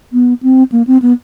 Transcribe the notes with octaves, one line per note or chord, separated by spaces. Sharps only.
B3
C4
A#3
C4
B3